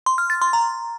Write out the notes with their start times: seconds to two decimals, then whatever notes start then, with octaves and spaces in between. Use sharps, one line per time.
0.06 C6
0.18 F6
0.30 A6
0.42 C6
0.53 A#5